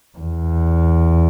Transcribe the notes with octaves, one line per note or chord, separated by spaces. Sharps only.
E2